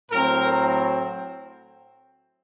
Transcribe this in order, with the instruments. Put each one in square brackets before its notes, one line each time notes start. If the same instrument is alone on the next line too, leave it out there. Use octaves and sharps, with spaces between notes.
[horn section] A2 F#3 C4 A#4